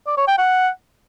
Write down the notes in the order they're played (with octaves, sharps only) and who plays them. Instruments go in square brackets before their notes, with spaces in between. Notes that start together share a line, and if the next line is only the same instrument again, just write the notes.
[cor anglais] D5
C#5
G5
F#5